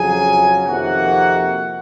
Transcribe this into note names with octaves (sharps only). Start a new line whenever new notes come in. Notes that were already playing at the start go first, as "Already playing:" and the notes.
Already playing: F2 C#3 F#3 G#4 G#5
F2 C3 D#3 A#3 F#4 F#5